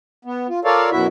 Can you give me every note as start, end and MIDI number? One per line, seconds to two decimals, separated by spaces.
0.25 0.47 59
0.49 0.60 65
0.65 0.90 65
0.65 0.90 69
0.65 0.90 70
0.65 0.90 73
0.65 0.90 74
0.65 0.90 77
0.91 1.07 42
0.91 1.07 47
0.91 1.07 54
0.91 1.07 64
0.91 1.07 66
0.91 1.07 76